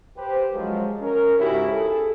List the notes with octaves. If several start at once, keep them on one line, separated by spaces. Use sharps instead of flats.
G4 B4 C5
F#2 F3 F#3 G#3
C#4 A#4
G#2 C#3 E4 F#4 G4
G#4 A4